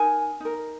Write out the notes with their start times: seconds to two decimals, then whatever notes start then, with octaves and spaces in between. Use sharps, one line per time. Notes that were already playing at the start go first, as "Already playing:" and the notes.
Already playing: D#4 A#4 G#5
0.40 D#4 A#4